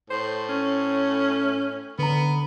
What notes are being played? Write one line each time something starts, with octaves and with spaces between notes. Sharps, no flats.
A2 C5
C#4
D3 B3 A#5